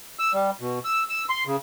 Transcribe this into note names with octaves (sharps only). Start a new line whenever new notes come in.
E6
G3
B2
E6
E6
C6
C#3